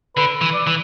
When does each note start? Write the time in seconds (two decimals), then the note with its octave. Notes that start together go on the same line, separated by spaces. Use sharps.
0.16 D3 B4
0.41 E3
0.54 D5
0.67 E3